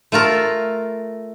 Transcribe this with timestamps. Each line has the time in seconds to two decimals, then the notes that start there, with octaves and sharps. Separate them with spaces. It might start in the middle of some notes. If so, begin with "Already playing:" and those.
0.12 A3 F4 A4 A#4